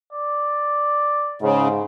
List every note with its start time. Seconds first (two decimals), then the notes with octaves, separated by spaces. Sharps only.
0.13 D5
1.42 G#2 C#3